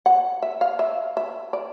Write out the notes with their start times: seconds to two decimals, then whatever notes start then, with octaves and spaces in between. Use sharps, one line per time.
0.06 F#5
0.42 E5
0.61 F5
0.79 E5
1.17 E5
1.53 D5